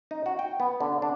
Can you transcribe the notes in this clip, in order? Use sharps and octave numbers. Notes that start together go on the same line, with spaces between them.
D#4
F#4
G5
B3
D3
D4